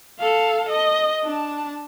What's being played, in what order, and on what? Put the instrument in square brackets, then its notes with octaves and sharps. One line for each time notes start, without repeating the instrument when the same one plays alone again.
[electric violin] A4 F5
D#5
D4 A5